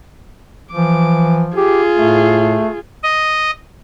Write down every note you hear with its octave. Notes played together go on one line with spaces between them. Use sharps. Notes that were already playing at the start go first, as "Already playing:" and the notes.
E3 F3 D6
F4 G4 G#4
A2 A3
D#5